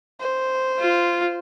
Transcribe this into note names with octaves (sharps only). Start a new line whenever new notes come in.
C5
F4